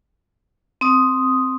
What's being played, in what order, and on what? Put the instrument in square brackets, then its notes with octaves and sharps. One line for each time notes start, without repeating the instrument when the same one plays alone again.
[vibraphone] C4 D#6